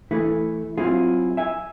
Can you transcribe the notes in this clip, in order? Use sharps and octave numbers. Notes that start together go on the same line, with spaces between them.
E3 A3 E4 G#4 B4
F#3 C4 E4 F4 G#4
E5 G#5